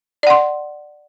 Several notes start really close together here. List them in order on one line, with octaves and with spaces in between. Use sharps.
D5 F#5 C6